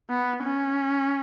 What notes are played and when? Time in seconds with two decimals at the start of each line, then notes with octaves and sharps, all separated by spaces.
0.10 B3
0.43 C#4